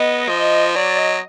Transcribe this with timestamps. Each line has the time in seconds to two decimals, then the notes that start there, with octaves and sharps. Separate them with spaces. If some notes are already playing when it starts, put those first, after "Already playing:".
Already playing: B3 D#5
0.29 F3
0.75 F#3 D5
0.98 D#5